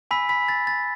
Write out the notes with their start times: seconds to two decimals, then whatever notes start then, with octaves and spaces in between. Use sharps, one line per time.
0.11 G#5 B5 E6 B6
0.29 B5 B6
0.48 A6
0.67 A6